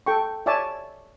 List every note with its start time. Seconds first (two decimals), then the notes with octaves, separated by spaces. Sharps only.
0.06 A4 G5 C#6
0.46 C#5 D5 E5 G#5 A5